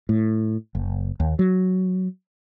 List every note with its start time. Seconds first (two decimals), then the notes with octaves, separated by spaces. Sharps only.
0.09 A2
0.75 F#1
1.20 D#2
1.39 F#3